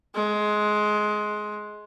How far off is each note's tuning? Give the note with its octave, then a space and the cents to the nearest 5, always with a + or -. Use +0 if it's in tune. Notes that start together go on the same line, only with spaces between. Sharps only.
G#3 +15